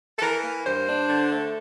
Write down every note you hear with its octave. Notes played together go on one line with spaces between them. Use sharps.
A4
E3 A#4
A#3
G2 C5
D4
D3
A3